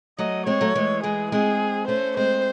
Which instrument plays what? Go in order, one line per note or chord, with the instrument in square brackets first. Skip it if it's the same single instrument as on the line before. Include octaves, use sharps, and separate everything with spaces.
[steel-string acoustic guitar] F#3 A3 [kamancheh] D#5
[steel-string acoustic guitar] G#3 C4 [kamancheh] C#5
[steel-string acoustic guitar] F#3 A3
E3 G#3
[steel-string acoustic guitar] E3 G#3 [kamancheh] G#4
[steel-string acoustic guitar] G#3 C4 [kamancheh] G#4
[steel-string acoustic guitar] A3 C#4 [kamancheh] C5
[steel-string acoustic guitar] G#3 C4 [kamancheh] C5